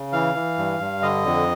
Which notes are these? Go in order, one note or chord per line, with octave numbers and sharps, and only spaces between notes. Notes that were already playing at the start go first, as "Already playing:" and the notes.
Already playing: C#3
E3 F5
E3
G2
G2
D3 D#5
F2